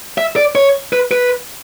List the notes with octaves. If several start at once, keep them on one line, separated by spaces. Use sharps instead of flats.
E5
D5
C#5
B4
B4